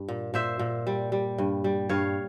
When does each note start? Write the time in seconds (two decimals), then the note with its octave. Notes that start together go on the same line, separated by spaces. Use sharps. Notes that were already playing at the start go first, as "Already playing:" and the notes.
Already playing: G2
0.08 A#2
0.34 A#2 C5 E5
0.59 A#2
0.87 G3
1.12 G3
1.38 G2
1.64 G3
1.89 G2 C#5 F5